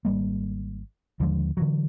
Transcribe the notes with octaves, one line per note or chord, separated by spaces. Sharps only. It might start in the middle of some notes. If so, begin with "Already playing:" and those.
G#1 G3 A#3
D#2 D3 F3 G#3
D3 E3 F#3